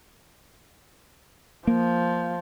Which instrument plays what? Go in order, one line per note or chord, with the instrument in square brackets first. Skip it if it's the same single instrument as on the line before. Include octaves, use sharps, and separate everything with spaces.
[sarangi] F3 [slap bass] A#3